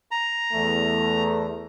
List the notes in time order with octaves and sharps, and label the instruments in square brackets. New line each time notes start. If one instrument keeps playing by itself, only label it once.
[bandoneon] A#5
[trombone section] E2 A3